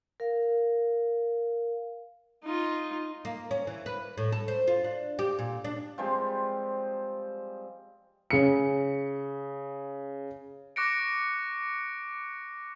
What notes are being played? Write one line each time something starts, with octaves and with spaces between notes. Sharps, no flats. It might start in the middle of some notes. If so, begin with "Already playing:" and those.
A#4 F5
D#4 F4
A#3
C#4
E3
B4
A2
A4
C5
F4
D4
G4
A#2
D4
F3 G3 G#3 C4
C#3 C#7
C#6 D6 F#6 A#6 C#7 D7